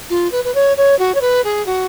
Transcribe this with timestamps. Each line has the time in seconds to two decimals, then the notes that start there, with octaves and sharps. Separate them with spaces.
0.10 F4
0.32 B4
0.44 B4
0.55 C#5
0.77 C#5
0.99 F#4
1.15 C#5
1.21 B4
1.44 G#4
1.66 F#4